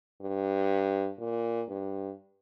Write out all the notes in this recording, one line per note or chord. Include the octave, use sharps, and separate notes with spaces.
G2
A#2
G2